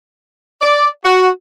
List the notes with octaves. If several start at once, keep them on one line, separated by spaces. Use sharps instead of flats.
D5
F#4